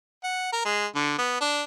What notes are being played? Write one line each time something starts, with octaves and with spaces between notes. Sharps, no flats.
F#5
A#4
G#3
D3
B3
D4